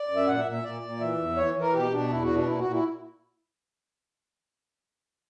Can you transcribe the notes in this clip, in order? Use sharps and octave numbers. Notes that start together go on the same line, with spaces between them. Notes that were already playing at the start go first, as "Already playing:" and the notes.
Already playing: D5
F#2
E5
A#2 F#5
E5
A#2
E5
A#2 D5
A#2
E3 E5
E2
E3 C#5
E3
A#4
B2 G4
B2 D4
E2 E4
F#4
B2
D4
A#2 E4
F#4
A#2
E4